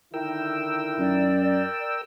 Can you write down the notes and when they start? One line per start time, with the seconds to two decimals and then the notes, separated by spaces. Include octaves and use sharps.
0.14 D3 D#3 E4 A#4 G5 E6
0.99 F#2 D5